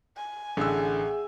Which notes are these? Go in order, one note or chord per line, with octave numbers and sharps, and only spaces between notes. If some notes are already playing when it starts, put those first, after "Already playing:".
G#5
A1 D3 G#4 E5 F#5 E6